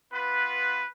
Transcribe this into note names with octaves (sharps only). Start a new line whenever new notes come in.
B3 F4 B4